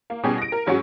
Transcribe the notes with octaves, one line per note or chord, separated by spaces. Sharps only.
A#3
B2 G3 C#4 G4 G#4
A#6 D7
A#4
G#2 F#3 C#4 F#4